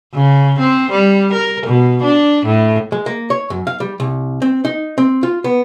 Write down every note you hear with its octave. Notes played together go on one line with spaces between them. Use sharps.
C#3
C4
G3
A#4
B2
D4
A2
G#3
A#3
C#5
F#2
F5
G3
C2
C4
D#4
C4
F4
B3